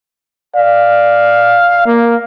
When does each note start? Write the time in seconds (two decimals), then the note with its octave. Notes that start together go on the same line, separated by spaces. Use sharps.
0.56 D5 F5
1.86 A#3